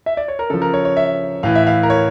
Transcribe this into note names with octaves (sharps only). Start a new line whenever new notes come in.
E5
D5
C#5
A#4
C#3 F3 A4
A#4
C#5
C#5
E5
A2 E3 F5
E5
F5
A#4
C#5